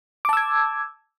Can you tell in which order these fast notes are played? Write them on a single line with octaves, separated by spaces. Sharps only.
D6 A5 E6 G#6